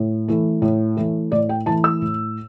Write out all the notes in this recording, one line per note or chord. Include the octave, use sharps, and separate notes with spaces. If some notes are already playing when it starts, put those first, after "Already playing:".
Already playing: A2
E3 A3
A2
E3 A3
A2 D5
G5
E3 A3 A5
E6
A2